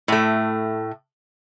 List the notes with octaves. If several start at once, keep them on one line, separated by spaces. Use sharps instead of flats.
A2 A3